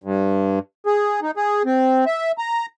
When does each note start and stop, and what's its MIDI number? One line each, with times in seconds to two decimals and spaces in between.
0.04 0.59 43
0.86 1.20 68
1.22 1.31 63
1.37 1.63 68
1.65 2.05 60
2.06 2.32 76
2.38 2.66 82